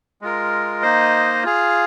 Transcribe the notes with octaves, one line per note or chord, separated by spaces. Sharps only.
G#3 F4 A#4
A#3 D#4 C5 D#5
F4 G#4 F5